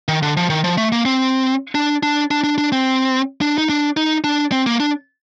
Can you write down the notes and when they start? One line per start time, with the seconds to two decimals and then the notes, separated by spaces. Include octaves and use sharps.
0.08 D#3
0.23 D3
0.37 F3
0.50 D#3
0.64 F3
0.78 A3
0.92 A#3
1.05 C4
1.75 D4
2.03 D4
2.31 D4
2.44 D4
2.58 D4
2.72 C4
3.41 D4
3.58 D#4
3.69 D4
3.97 D#4
4.24 D4
4.52 C4
4.66 A#3
4.80 D4